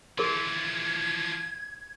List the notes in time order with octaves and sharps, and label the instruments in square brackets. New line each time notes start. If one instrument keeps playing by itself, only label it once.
[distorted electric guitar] E3 F3 [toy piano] G#4 A#4 C6 [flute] G#6